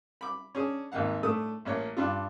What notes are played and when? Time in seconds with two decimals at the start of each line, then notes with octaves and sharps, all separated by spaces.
0.21 B5 D6
0.55 C#4 D4 G#4
0.92 G#1 D#2 A#3 F5 F#5
1.23 A2 A3 D4 D#6
1.65 A1 A#3 C#5
1.97 G2 D4 F4